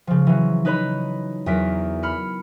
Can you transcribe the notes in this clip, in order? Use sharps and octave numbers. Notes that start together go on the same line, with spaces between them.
C#3 F3
E3 F#3
D#4 B4 C#5 B5
E2 F#3 A#4 B6 D7
B5 F6 C#7